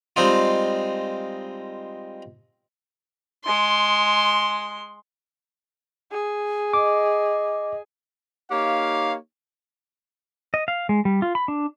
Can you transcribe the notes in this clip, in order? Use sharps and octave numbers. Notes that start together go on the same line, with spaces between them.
G3 G#3 C4 D#4 F4
G#3 C6
G#4
D#5 D6
A#3 D#4 G4 C#5 F5
D#5
F5
G#3
G3
F4
B5
D4